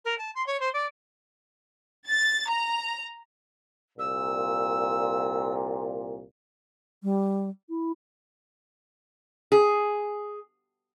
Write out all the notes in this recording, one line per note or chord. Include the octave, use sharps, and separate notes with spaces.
A#4
A5
C6
C#5
C5
D5
A6
A#5
C2 A#2 E6
G3
E4
G#4